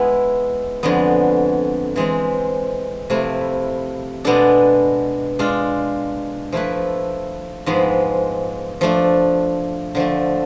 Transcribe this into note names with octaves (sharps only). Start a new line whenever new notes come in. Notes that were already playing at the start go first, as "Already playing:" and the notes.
Already playing: G#3 B3 E4
F2 D3 G#3 B3
E3 G#3 C4
C3 F3 A3 E4
B2 G#3 B3 D4 A4
G#3 D4 F4
F3 A3 E4 B4
G#2 F3 G#3 B3
F3 A3 D4
D3 F3 A3